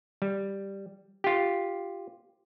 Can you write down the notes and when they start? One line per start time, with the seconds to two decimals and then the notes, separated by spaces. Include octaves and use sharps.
0.22 G3
1.24 F4 G4